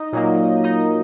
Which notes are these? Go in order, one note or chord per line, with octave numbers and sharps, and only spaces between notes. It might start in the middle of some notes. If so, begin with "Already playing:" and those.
Already playing: D#4 D#5
A#2 F#3 A#3
D#4 D#5